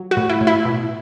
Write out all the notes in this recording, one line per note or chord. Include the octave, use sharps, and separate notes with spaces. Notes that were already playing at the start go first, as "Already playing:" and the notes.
Already playing: F#3
F#4
A2
E4
A2
E4
B2